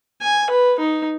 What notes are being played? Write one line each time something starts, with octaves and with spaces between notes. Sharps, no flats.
G#5
B4
D#4